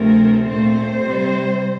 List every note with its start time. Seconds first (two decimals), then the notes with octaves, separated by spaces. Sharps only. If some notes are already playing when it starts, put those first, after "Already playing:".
Already playing: D2 C3 F3 A3 C4 A#4
0.46 A#2 A3 C4 C5
1.01 C3 G3 C4